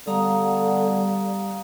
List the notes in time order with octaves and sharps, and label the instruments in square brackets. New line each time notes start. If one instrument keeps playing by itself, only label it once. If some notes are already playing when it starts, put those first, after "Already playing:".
[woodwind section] D3 B3 [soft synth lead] G3 [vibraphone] F5 A#5 D#6